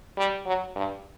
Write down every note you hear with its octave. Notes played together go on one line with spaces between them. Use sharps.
G3
F#3
G2